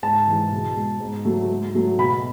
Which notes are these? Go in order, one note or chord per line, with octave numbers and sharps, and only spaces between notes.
G#2 A5
E3 G#3
B2
G#3
G#2
F#3 A3
G#2
F#3 A3
B2 B5